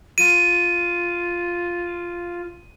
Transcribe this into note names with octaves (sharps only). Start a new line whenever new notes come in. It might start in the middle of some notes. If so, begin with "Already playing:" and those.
F4 D#7